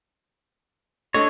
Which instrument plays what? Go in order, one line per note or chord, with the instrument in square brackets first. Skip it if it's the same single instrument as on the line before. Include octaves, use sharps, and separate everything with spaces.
[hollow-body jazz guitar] D4 A4 D#5 [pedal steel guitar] C#5